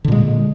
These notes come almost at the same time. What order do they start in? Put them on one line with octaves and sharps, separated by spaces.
D3 A#2 G#3